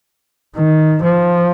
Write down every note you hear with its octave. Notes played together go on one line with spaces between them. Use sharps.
D#3
F3